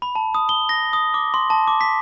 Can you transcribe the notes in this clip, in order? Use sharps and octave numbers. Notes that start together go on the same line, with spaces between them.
B5
A5
D#6
G7
A#6
D#6
D6
C6
A5
D6
B6